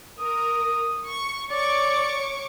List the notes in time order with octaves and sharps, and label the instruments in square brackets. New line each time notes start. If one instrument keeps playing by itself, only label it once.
[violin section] A#4 [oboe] D#6
[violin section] C#6
[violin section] C#5 C#6 D6 [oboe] D5